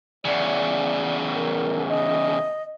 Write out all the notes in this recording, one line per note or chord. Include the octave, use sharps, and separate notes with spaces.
E2 C#3 D5
A#4
D#5